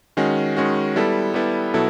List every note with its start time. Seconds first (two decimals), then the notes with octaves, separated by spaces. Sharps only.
0.17 D#3 G#3 C#4 F#4
0.57 D#3 G#3 C#4 F#4
0.96 G3 B3 E4 A4
1.34 G3 B3 E4 A4
1.74 B2 F#3 B3 E4 A4